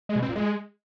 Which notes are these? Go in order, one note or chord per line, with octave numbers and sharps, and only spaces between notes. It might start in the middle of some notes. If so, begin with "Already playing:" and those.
G#3
B2
C4
A#2
G#3